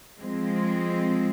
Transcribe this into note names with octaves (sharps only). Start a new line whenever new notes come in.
F3 G#3 C4